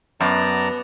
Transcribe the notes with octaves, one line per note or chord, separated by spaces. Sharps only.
F#2 B3 D5 A5 A#5